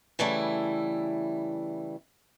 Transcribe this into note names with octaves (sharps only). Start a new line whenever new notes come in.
C#3 E3 G3 A3 E4